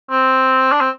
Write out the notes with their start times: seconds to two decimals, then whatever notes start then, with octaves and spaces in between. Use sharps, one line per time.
0.11 C4
0.72 D4
0.81 C4